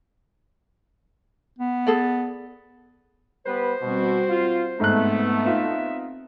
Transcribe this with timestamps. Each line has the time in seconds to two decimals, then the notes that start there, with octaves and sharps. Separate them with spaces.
1.59 B3
1.87 G#4 A4 D5
3.46 G3 B3 B4 C5
3.82 B2 G3 C4 F#4
4.29 F4
4.80 G#2 A3 B3 C4 F#6
5.46 D#4 F4 E5